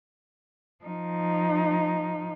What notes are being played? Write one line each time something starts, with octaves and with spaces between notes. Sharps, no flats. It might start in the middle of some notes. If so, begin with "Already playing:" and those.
F3 D#4